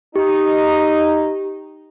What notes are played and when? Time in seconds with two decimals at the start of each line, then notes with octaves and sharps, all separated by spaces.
0.16 D#4 G4